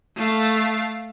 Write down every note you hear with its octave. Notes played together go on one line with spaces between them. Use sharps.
A3 F5